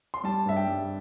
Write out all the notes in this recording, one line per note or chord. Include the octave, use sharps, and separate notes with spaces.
C6
G3 A5
G2 E5
G5
G3